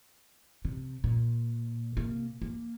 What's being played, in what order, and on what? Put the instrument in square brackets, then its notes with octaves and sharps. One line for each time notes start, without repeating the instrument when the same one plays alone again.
[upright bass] C3
A#2
C3 A#3
A#3